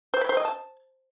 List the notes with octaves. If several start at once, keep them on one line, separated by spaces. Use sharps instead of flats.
C5
B4
C5
D#5
A5